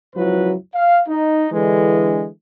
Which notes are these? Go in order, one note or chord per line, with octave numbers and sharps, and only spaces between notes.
C#2 F#2 F3 F#3 E4 B4
F5
D#4
D3 E3 G#3